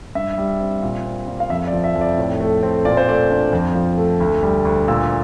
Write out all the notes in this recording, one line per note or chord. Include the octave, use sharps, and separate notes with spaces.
G2 E5
G3
C4
A#2
C4
A#2
F5
F2 E5
D5
F3
E5
F2
D5
A2
A3
C4
A#2 D5
C5
A3 D5
D4
F2
F3
A3
D2
G3
D2
A#2 E6